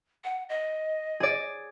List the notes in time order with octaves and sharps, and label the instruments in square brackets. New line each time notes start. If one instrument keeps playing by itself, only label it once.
[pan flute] F#5
D#5
[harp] G#4 D5